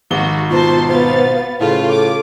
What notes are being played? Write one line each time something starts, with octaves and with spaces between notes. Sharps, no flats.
G#1 F#4 G7
B2 F4 C5 A5 C6
B3 C5 F5 A6
A2 C#3 F4 A4
D6